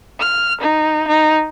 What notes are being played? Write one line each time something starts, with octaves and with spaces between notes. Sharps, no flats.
F6
D#4
D#4